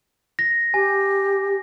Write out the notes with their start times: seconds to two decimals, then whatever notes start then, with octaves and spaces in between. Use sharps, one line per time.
0.39 A#6
0.74 G4 G#5